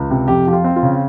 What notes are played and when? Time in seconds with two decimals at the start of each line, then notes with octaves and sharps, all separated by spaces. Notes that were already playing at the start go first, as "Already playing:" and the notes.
Already playing: C#2
0.11 C3
0.28 F2 G4
0.47 F3 G4
0.53 F4
0.64 C4
0.76 F4
0.83 C#3